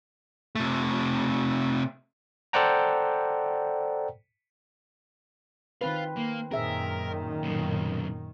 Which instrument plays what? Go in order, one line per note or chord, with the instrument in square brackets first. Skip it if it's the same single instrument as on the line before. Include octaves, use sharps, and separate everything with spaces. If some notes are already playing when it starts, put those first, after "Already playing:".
[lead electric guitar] C3 A3
[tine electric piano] A4 C5 D5 F#5 G5 A#5
[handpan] D#3 C4 B4 [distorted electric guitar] F4 F5
[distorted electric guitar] A#3
[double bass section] F#2 A#2 D#3 [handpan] C4 G#4 E5 [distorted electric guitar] A#4
[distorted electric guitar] B1 C#3